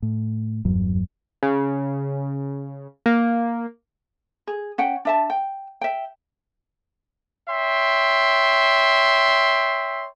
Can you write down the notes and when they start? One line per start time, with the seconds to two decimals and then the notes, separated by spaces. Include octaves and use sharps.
0.02 A2
0.65 F#1 E2 G2 F#3
1.43 C#3
3.06 A#3
4.47 G#4
4.78 C#4 F#5 G5
5.05 D4 E5 A5
5.30 G5
5.81 E5 G5
7.49 C#5 E5 G5 C6